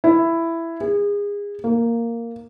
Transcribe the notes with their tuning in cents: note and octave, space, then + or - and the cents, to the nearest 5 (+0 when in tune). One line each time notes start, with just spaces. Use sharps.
E4 +10
G#4 -30
A#3 -5